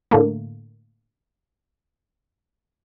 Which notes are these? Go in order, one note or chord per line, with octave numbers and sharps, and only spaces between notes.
A2 D3 A3 A#3